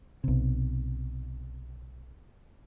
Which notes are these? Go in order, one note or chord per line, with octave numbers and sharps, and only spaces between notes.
B1 C3